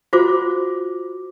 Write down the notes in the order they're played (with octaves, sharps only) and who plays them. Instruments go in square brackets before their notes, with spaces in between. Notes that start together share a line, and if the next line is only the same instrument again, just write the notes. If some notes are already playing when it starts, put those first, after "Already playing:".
[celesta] F4 F#4 C5 D6